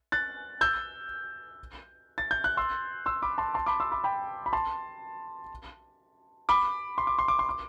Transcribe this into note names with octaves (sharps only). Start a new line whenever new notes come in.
F#6 A6
E6 G6
A6
G6
F#6
C6 E6
C6 E6
B5 D6
A5 C6
A5 C6
B5 D6
C6 E6
B5 D6
G5 B5
B5
A5 C6
B5 D6
C6
D6
C6
D6
C6
D6